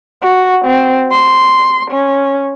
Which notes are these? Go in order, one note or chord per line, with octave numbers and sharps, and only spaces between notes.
F#4
C4
C6
C#4